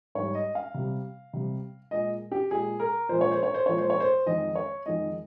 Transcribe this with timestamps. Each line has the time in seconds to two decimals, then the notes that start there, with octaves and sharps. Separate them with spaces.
0.15 G#2 G3 C#5
0.35 D#5
0.55 F5
0.74 C3 G3
1.33 C3 G3
1.91 A#2 G#3 D#5
2.32 G4
2.51 A#2 G#3 G#4
2.80 A#4
3.09 A#2 F3 G#3 C5
3.21 C#5
3.31 C5
3.43 C#5
3.54 C5
3.66 A#2 F3 G#3 C#5
3.78 C5
3.90 C#5
4.00 C5
4.26 F2 D#3 G#3 D#5
4.55 C#5
4.86 F2 D#3 G#3 D#5